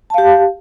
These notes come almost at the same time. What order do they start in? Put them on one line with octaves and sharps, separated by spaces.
A5 F5 G4